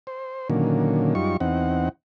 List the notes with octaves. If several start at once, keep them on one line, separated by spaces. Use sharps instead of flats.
C5
A#2 D3 D#3 F#3 A#3 C#4
F#2 G3 D#4 F4 C#6
E2 C4 D#4 F#5